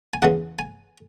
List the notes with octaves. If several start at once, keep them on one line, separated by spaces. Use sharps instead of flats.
G#5
E2 C#3 E3 G#3 F#5
G#5